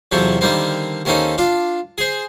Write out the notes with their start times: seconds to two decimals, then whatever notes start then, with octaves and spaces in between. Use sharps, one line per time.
0.12 E2 C3 F3 F#3 A4
0.41 D3 D#3 G3 A#3 C4
1.05 D#2 A#3 C4 C#4 D#4 A4
1.38 D4 F4
1.98 G#4 C5